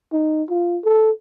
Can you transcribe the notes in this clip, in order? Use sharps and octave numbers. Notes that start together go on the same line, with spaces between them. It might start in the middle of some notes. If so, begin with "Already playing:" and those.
D#4
F4
A4